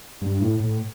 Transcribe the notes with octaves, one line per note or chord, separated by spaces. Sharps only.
G2
A2
A2